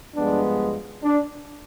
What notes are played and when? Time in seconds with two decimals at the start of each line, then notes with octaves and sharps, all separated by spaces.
0.15 G2 F3 G#3 B3 D4
1.04 D4